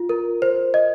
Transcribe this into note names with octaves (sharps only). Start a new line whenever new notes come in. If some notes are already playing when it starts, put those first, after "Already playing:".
Already playing: F4
A#4
C5
D#5